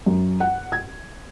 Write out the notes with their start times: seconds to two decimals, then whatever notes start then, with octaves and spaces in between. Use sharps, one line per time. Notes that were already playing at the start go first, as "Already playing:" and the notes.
0.06 F#2
0.40 F#5
0.72 G#6